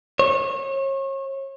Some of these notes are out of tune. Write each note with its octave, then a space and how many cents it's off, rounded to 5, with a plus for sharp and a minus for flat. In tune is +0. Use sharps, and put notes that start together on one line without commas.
C#5 -35